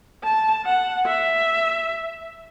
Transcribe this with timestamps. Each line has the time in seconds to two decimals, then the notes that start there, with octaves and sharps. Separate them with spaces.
0.24 A5
0.65 F#5
1.06 E5